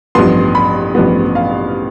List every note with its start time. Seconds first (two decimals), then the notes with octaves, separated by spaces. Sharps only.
0.15 A1 G2 F3 B3 C6
0.55 B5
0.95 A1 G2 F3 B3
1.35 F5